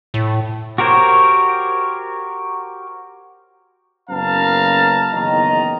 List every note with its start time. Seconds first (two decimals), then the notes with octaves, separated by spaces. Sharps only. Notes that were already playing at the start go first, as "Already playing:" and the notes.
0.14 A2
0.78 F#4 G4 A#4 C5 C#5
4.09 F#1 F#2 B3 F5 A5 A#5
5.13 F#1 E2 D#3 D#5 A#5